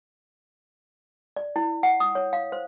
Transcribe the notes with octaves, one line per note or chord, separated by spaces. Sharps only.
D5
E4
F#5
D#6
C#5
F5
C5